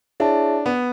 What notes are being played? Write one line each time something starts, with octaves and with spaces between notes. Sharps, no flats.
D4 E4 G#4 C#5 E5 A5
B3